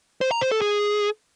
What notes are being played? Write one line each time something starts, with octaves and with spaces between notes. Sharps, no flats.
C5
A#5
C5
A4
G#4